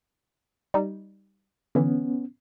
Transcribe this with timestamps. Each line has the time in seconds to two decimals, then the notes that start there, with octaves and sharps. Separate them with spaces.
0.74 G3 D#4
1.75 D3 E3 B3 C#4